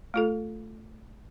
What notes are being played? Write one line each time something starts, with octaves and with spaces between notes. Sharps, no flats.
A3 F4 A4